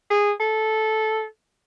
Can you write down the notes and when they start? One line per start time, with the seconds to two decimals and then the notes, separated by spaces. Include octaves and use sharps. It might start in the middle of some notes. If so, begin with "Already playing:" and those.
0.10 G#4
0.40 A4